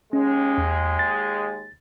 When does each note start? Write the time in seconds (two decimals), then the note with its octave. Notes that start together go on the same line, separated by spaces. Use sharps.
0.13 D#2 G#3 C#4
0.58 E2
0.99 A6